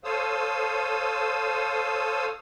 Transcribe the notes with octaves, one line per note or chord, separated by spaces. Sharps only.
A4 C5 C#5 F5 D#6 E6